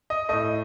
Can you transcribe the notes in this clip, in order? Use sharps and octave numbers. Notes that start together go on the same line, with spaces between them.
D#5
A2 A3 D#5